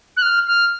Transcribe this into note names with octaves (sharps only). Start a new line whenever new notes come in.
F#6
F6
F6